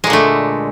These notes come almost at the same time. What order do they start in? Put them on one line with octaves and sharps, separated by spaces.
G#3 A#2 D3 A3